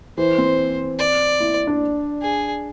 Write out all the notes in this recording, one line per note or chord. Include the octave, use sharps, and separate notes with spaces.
E3 C5
C4
D5
E4
D4
G#4